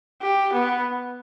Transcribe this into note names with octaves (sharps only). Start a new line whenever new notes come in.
G4
B3